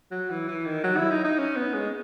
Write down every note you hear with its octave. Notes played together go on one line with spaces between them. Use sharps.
F#3
E3
E3
D#3
F#3
E4
D#4
D#4
C#4
B3
G#3